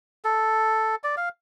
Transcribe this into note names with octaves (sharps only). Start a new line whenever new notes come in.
A4
D5
F5